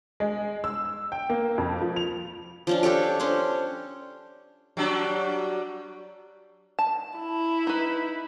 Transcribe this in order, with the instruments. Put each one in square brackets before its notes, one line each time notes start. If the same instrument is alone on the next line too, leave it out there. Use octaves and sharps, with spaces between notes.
[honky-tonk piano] G#3
E6
G5
A#3
F2
F3
F7
[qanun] F3 C#4 D4
D4 G4 A4 C#5
C#4 D4 C5
[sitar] F#3 G3 D4
[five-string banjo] A5
[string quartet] E4
[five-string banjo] D#4 B4